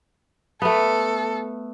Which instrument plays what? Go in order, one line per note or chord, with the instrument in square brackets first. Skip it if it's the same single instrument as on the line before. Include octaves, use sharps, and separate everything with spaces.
[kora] A3 B3 [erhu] A4